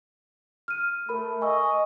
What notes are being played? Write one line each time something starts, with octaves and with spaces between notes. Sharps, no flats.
F6 D#7
A3 A#4 B5
D#5 G#5 C#6 E6